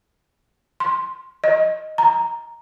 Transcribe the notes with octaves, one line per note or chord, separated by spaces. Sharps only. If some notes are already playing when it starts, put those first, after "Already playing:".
C6
D#5
A#5